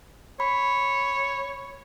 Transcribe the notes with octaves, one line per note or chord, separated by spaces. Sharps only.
C#5 B5